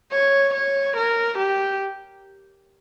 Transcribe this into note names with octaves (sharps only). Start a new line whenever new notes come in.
C#5
C#5
A#4
G4